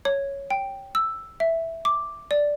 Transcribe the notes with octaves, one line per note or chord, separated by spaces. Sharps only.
C#5
G5
E6
E5
D6
D5